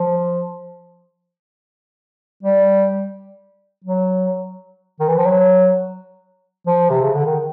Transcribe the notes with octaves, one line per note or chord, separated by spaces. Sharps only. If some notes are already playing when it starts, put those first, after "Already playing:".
Already playing: F3
G3
F#3
D#3
E3
F3
F#3
F3
C3
C#3
D3
D#3